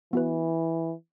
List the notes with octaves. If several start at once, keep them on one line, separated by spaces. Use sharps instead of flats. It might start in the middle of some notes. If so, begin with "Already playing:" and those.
E3 B3 F#4 B4